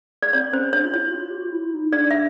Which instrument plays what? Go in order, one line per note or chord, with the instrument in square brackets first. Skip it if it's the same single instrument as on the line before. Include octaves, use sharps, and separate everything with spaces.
[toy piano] D5
[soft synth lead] C4 [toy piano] C#5
[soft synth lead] C#4 [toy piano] C5
[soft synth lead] D4 [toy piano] C#5
[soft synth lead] F4
[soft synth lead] E4 [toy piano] C#5
[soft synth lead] F#4
F4
G4
F#4
F4
E4
D#4
[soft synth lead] D4 [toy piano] D5
[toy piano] E5